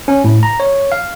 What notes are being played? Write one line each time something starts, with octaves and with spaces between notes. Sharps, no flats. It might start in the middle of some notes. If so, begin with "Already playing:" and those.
C#4
A2
A#5
C#5
F5